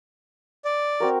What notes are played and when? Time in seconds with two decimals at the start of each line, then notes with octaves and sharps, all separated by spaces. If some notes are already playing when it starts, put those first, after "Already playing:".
0.65 D5
1.00 C4 F#4 A#4